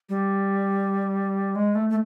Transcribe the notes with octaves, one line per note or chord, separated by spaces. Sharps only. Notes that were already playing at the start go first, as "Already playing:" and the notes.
G3
G#3
A3
A3